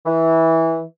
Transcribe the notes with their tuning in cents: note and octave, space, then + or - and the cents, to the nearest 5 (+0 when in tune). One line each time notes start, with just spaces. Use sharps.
E3 -15